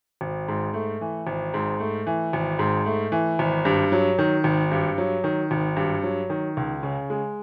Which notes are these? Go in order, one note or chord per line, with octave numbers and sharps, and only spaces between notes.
G#1
G#2
A3
E3
G#1
G#2
A3
E3
G#1
G#2
A3
E3
G#1
G2
F#3
D#3
G#1
G2
F#3
D#3
G#1
G2
F#3
D#3
C#2
C#3
G#3